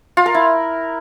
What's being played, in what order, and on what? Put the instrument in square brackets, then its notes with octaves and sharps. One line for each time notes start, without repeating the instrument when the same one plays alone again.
[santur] F4
A#4
E4